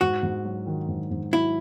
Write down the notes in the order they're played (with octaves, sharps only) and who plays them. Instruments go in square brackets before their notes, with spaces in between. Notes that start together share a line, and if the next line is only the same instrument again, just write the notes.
[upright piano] G#2 [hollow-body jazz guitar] F#4
[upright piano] G#2
F#3
D#3
G#2
G#2
[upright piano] F#3 [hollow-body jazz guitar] E4